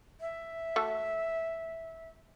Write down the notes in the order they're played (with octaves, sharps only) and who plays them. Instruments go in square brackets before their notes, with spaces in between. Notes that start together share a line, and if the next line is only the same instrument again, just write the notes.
[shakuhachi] E5
[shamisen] A3 F#4 A4